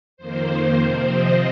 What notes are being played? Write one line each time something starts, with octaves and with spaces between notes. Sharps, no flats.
F2 D#3 A#3 C5
C3 F3 C4
D#5